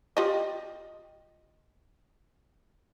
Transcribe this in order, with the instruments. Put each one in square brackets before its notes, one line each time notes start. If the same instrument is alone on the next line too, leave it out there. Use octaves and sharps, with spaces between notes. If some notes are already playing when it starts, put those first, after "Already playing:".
[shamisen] F4 G4 D#5